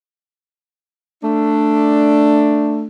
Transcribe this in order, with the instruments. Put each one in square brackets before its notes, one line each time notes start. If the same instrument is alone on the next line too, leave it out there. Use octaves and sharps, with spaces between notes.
[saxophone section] A3 D4